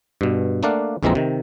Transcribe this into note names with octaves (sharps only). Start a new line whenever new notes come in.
G2 B2
A3 A#3 D4 D5 F5 F#5
A#1 F2 E3 G#3 C4 A#5
C3 D#3